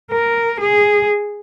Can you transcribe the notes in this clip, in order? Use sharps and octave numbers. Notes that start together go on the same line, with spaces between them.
A#4
G#4